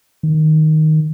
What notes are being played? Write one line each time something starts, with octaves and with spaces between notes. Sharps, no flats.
D#3